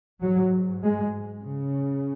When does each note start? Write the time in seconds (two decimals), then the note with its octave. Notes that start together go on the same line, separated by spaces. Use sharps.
0.22 G#2 F#3
0.83 G#3
1.43 C#3